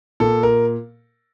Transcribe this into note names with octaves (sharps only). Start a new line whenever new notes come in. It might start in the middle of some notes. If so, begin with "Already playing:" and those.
A#2 A4
A#4